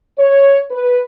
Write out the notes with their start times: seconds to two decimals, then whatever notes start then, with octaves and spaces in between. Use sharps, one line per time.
0.19 C#5
0.71 B4